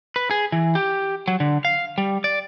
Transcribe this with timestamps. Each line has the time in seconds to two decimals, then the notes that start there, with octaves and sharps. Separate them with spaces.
0.16 B4
0.31 G#4
0.52 E3
0.75 G4
1.28 F#3
1.40 D3
1.65 F5
1.98 G3
2.24 D5